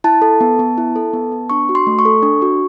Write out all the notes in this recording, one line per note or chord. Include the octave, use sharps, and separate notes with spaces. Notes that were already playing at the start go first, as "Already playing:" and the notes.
E4 A5
A4
B3
B3
E4
A4
B3
B3
D4 C#6
F#4
C6
A3
C#6
A4
D4
F#4